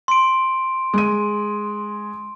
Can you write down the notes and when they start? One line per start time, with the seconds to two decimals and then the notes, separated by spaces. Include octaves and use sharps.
0.08 C6 D7
0.94 G#3 D#7